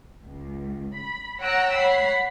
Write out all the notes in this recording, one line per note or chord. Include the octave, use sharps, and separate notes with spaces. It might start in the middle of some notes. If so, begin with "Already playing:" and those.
C#2
B5
C#5 F#5 G5 A#5 E6 F#6
C#5 F#5 B5 C7